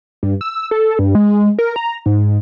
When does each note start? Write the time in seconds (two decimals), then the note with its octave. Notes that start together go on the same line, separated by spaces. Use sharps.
0.23 G2
0.41 E6
0.71 A4
0.99 G2
1.15 G#3
1.59 A#4
1.76 A#5
2.06 G#2